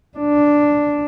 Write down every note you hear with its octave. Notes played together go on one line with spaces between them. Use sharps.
D4